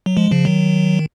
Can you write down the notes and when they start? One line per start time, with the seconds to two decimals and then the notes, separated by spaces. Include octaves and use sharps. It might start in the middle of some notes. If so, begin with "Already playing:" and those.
0.06 F#3
0.17 F3 G#3
0.31 C#3 F3
0.45 D#3 F#3